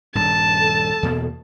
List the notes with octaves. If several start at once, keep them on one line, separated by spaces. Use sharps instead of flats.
D#1 G2 A5
A4
E2 B2 A#3